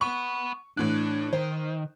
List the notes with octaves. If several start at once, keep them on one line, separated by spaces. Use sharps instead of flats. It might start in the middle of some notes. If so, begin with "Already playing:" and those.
F#5 B5 C#6
A2 E3 D4 F#6
D#3 C5